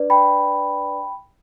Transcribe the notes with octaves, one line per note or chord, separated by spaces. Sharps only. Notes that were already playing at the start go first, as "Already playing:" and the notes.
Already playing: D4 B4 D5
G5 B5